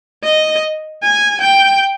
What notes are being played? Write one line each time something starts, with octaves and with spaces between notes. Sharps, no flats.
D#5
G#5
G5